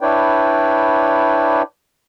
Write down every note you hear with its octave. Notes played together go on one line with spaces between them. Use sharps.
D4 E4 B4 C#5 D5 G5